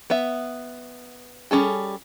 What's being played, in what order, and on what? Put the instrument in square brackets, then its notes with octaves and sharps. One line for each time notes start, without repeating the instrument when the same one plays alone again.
[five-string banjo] B3 E5
G3 C#4 G#4 A4